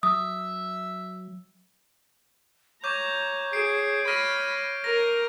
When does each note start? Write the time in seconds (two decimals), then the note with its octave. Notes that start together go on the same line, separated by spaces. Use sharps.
0.03 F#3 E5 D#6
2.84 C#5 A#5 C#6 D6 G6
3.53 G#4 C7 D7
4.08 B5 F6 A#6 D#7
4.84 A#4 A#5 A#6